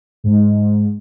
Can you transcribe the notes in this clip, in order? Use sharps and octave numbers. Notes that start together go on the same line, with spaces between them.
G#2